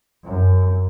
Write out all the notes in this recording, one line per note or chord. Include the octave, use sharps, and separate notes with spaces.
F#2